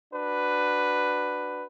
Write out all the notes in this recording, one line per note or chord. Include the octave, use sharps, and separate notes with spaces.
D4 F#4 B4